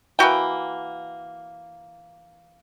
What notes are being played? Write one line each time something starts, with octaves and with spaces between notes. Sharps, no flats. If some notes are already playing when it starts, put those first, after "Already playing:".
E3 A#3 F#4 G5